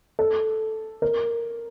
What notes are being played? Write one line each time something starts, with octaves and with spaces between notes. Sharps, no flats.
A4
A#4